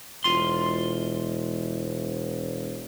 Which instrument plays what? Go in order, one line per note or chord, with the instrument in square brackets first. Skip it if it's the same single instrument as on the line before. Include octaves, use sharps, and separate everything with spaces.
[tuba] E1 [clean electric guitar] F4 C6